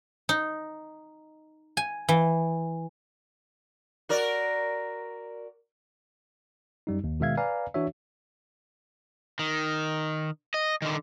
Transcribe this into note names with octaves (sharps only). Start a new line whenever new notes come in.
D#4
G#5
E3
F#4 A#4 D5
F#2 G3 D#4
D#2
B2 D#3 G#3 E5 F5 G#6
B4 D5 F5 G#5 A#5
E3 D4 F#4 C#5 E5
D#3
D#5
D3 D#3